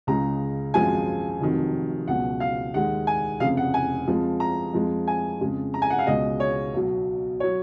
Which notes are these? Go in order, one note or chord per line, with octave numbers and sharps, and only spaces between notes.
C#2 C#3 G#3 A#5
G#1 F#2 F3 G#3 G#5
F1 F2 D#3 F#3
C#2 B2 F#3 F#5
F5
D#2 D#3 G#3 F#5
G#5
F1 F2 C#3 F5
F#5
G#5
F2 F3 G#3
A#5
F2 F3 G#3
G#5
F2 C#3 G#3
A#5
G#5
F#5
F5
C#2 B2 G#3 D#5
C#5
B1 B2 F#3
F#3 C#5